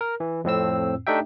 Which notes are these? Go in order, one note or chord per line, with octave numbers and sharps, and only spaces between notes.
A#4
E3
F2 A2 C4 E6
A3 D4 D#4 G4 E5 G5